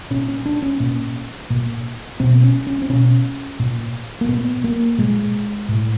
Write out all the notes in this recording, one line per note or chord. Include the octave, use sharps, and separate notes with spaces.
A#2 C#4
C#4
D4
C#4
A#2
A#2
B2 C4
C#4
C#4
C4
B2 C#4
A#2
A#3
A#2 B3
A#3
A#2 G#3
A2